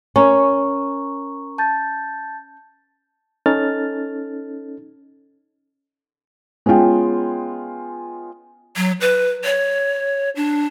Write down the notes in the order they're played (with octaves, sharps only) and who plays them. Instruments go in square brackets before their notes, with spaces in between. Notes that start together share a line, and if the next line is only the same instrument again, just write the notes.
[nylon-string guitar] C#4 [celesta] A#4 A#5 C#6
[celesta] A5 G6 A6
[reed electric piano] C#4 D#4 A4 F6 A6
[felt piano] G#3 B3 C#4 F4 G5
[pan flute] F#3
B4
C#5
D4